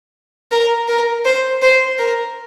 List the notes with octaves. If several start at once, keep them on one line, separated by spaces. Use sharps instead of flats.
A#4
A#4
C5
C5
A#4